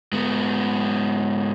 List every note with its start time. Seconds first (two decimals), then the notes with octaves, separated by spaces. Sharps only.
0.12 G#2 B3